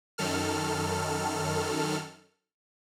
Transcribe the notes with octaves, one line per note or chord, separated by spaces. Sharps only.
F#2 D#3 A4 F6